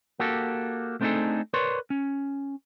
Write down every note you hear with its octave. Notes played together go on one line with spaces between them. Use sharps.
A#3 F#4 G4 A4
A3 C4 D4 D#4 G#4 A4
A#4 B4 C#5 D5 C6
C#4